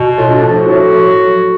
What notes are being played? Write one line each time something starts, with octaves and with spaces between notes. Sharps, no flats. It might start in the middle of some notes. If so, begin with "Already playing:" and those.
Already playing: B2
A2 F4
D4
F3
F#4
A2
A2
F#3